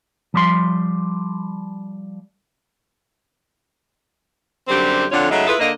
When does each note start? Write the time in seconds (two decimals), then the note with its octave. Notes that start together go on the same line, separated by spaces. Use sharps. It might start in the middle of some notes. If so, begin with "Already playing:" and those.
0.34 F3 G3 C6
4.68 F#2 D3 G3 C4 G4
5.12 F2 D3 D4 F4 C#5 F#5
5.30 C#3 F#3 G#3 A3 D#4 E5
5.47 E4 F4 G#4 A4 B4
5.60 D3 A#3 D#5